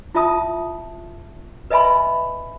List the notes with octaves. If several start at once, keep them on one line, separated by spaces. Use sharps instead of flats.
E4 F4 E5 A5 D#6
B4 D#5 E5 G#5 B5 C6